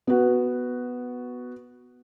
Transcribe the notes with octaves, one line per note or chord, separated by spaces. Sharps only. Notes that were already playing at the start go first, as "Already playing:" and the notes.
B3 F#4